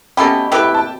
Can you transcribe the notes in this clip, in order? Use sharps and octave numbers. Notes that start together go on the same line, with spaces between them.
B2 A3 C#4 G4 B5
A3 E4 G4 B4 G5
G5
A5